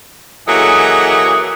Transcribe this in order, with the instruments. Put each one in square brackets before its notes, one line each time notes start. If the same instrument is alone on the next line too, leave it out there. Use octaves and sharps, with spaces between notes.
[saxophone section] E3 F#3 A#3 G#4 A4 D#5